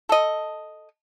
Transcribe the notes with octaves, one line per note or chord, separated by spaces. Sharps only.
A4 D#5